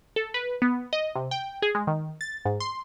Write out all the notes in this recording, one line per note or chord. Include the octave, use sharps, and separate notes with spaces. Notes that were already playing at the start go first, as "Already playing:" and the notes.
A4
B4
B3
D#5
C3
G5
G#4
G#3
D#3
A6
G#2
C6